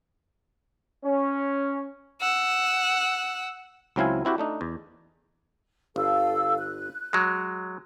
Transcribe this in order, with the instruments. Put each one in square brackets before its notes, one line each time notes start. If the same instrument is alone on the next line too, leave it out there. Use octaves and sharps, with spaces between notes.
[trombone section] C#4
[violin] F#5 E6
[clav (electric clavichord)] C#2 F#3 C4 E4 F5 G#5
C4 E4 F#4 G4
A3 D4 D#4
E2
[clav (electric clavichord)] G1 [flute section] A4 F5 E6
[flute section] F#6
[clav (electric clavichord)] F#3 G#3